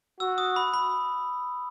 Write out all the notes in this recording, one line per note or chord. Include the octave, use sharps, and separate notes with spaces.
F#4 E6
D#6
B5
B5